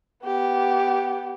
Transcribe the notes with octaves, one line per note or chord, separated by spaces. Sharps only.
B3 G4